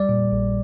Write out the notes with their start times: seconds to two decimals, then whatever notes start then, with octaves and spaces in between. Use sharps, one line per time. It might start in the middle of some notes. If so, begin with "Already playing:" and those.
Already playing: G3 D5
0.09 A#2
0.32 A#1